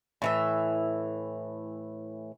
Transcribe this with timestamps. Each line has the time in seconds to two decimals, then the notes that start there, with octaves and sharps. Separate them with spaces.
0.22 A2 E3 E5